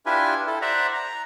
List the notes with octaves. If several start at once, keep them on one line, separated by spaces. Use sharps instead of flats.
D4 E4 F4 G4 B4 G#5
E4 A4
C5 D5 E5 F#5 A#5
A#5